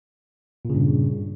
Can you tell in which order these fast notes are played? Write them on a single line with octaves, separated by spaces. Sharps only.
A#2 C#3 G2